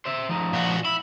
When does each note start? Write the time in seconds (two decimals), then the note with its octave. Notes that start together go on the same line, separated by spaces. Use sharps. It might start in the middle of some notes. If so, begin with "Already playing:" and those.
0.05 C5 E5
0.29 F3 D#4
0.53 A#2 F#4
0.85 E4 B5